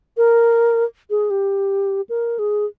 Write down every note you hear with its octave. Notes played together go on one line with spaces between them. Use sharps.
A#4
G#4
G4
A#4
G#4